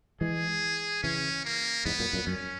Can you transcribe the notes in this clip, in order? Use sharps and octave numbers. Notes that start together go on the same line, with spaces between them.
E3 G#3 G#4
C#3 E3 C#4
A#3
E2 G#2 B3
F#2 A#2
F#2 A#2
F#2 C#4